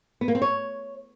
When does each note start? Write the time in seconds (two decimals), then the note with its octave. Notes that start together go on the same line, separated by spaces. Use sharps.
0.21 B3
0.28 A#3
0.35 C4
0.42 C#5